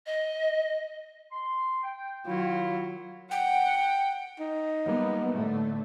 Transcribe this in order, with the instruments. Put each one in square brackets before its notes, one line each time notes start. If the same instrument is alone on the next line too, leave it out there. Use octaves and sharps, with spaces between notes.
[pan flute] D#5
[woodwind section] C6
G5
[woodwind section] D#3 E4 [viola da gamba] F#3 [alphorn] F4
[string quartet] F#5 [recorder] G5
[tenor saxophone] D#4
[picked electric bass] F#3 G3 A#3 [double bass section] B3
[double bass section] A2 D3 A3